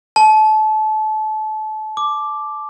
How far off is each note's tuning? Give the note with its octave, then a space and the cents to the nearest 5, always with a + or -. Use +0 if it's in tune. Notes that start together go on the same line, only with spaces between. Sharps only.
A5 -30
D6 +5